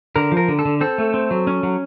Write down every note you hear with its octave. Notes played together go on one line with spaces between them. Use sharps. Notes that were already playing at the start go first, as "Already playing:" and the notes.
D3 A#4
F3
A#4
D3
A4
D3
C4 A4
A3
C4
F#3
C#4
F#3